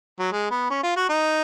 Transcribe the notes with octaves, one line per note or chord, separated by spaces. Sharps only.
F#3
G#3
B3
C#4
F4
F#4
D#4